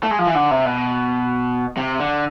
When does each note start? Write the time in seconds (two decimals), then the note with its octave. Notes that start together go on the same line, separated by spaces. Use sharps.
0.03 A3
0.11 G#3
0.19 F3
0.27 E3
0.35 D3
0.51 C3
0.65 B2
1.77 C3
2.00 D3